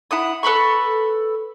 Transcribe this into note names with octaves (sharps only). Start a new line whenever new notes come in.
E4 F#5 D#6
A4 B4 B5 C#6